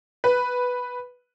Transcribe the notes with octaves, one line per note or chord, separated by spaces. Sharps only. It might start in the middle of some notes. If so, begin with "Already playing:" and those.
B4